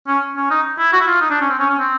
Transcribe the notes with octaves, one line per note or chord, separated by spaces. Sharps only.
C#4
C#4
D#4
E4
F#4
E4
F4
D#4
D4
C#4
C4
C#4
C#4
C4